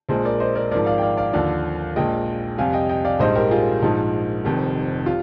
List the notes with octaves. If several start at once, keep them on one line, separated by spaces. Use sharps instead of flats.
A#1 A#2 G#3 G#4 C5
A#4 D5
C5 D#5
A#4 D5
G#1 G#2 F3 A#4 D5
D5 F5
G5
D5 F5
D5 F5
D#2 D3 F3 D5 F5
A#1 A#2 G#3 D#5 G5
F2 C3 G3 F5 G#5
D#5 G5
D#5 G5
D5 F5
A#1 G#2 G3 C5 D#5
G4 A#4
F4 G#4
A#1 G#2 F3 G#3 D#4
F1 F2 D#3 G3
G3 F4